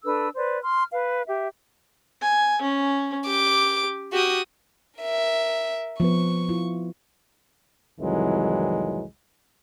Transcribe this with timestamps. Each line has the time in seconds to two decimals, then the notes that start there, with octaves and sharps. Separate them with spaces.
0.04 D4 A4 B4 E6
0.36 B4 C5 D5
0.63 C6 F6
0.93 B4 F5
1.26 G4 E5
2.22 G#5
2.62 C#4
3.27 G4 D6
4.13 F#4 G4 D#6
5.00 A#4 E5
6.00 F3 B3 B4 C#6
6.49 E4 F4
8.00 C2 F2 D#3 E3 F#3 G#3